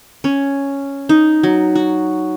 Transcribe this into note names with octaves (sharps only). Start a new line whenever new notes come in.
C#4
D#4
F#3
F#4